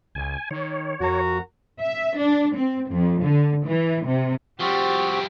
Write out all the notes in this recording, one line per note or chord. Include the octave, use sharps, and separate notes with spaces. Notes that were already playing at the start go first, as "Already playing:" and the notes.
C#2 G#5
D#3 C#5
F2 F#4 A#4 F#5 A#5
E5
D4
C4
F2
D3
E3
C3
F3 G3 C4 F#4 G4